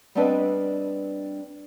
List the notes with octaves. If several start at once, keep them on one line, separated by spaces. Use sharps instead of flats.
G3 B3 C4 D4 B4 D#5